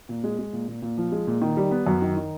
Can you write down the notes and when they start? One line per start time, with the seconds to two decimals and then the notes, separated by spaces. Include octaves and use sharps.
0.09 A#2
0.24 G#3
0.39 G#3
0.53 A#2
0.68 A#2
0.82 A#2
0.98 F3
1.12 G#3
1.27 A#2
1.42 D#3
1.57 G3
1.71 B3
1.87 F#2
2.02 D#3
2.17 D#3